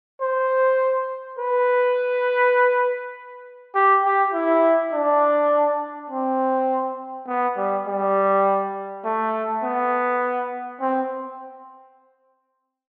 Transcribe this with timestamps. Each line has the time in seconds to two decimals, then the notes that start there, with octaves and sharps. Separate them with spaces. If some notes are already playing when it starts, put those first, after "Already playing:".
0.22 C5
1.39 B4
3.75 G4
4.04 G4
4.34 E4
4.93 D4
6.10 C4
7.28 B3
7.57 G3
7.87 G3
9.05 A3
9.63 B3
10.81 C4